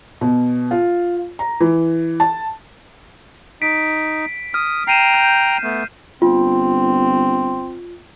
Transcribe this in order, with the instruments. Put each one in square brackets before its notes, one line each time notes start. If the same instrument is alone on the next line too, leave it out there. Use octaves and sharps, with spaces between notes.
[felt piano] B2
F4
A#5
E3
A5
[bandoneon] D#4 [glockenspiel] B6 D7
[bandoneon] D#6 [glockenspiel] F6
[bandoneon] G5 A#5 [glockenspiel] C7 D#7 E7
[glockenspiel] G6
[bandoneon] A3 B3
[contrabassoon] G1 [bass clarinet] C4 [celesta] F4